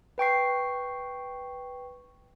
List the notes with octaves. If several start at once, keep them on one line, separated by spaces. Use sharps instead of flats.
B4 G5 C#6 C7